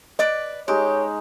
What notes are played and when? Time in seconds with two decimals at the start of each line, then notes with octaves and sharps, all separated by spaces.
0.19 B4 D5 D#5 D6
0.68 G#3 D#4 G4 C#5